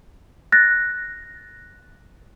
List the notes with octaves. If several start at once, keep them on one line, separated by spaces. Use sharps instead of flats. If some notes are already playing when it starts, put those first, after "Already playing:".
F#6 A6 A#6